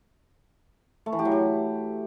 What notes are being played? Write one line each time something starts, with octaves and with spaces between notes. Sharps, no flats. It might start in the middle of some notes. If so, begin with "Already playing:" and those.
A3
E3
G4
F#3
G4